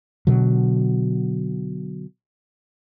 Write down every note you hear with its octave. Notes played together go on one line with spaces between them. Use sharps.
B2 D3 F#3